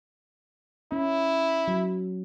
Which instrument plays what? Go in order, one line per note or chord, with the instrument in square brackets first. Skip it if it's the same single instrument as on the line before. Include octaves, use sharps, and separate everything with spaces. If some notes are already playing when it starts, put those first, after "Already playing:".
[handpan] C#4 [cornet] E4
[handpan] F#3